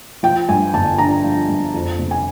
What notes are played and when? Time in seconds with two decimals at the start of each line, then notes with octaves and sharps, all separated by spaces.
0.23 F3 G5
0.49 G2 G#5
0.73 G1 A5
0.98 D3 A#5
1.24 F3
1.49 G2
1.74 F2
1.99 C3
2.11 G#5